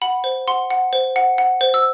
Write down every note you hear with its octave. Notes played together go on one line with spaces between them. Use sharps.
F#5 B5
C5
F#5 C6
F#5
C5
F#5
F#5
C5
E6